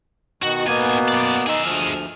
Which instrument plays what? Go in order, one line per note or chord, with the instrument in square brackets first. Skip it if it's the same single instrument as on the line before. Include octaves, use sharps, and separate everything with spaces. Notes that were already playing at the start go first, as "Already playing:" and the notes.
[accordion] B2 D#3 [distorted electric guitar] F#4
[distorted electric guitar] D#2 G#5 [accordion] B2 A#3 B3
[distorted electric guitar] F#2 D5
[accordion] D#4 [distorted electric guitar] G#4 E5
[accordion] D2 F3 F6